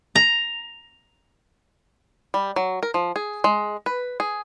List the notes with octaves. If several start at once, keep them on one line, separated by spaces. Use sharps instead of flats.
A#5
G3
F#3
A#4
F3
G#4
G#3
B4
G#4